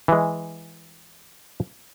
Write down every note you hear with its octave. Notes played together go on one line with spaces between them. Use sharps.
E3 G#3